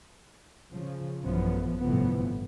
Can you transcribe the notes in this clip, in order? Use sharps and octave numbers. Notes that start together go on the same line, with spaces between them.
C#3 F3
A1 F#2 F3 B3
G1 A2 C3 E3 F3 B3